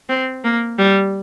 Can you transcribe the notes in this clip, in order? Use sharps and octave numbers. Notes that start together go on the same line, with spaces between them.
C4
A#3
G3